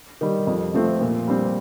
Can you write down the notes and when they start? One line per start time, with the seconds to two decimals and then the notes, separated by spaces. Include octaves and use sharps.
0.21 D#3 G3
0.47 F2
0.73 C3 F3 A3 C4
1.01 A#2
1.28 G3 C4